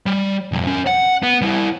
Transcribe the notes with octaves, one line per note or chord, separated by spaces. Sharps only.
G3
B1 F2
C#4 A#4
F#5
B3
G3 E4